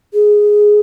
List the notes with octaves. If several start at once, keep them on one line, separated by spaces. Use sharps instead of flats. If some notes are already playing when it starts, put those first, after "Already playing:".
G#4